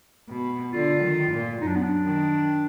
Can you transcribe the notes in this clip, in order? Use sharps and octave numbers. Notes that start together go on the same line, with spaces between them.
B2
D3 F4
D#3
A#2
F#2 D#4
D4
B3
D4
D#3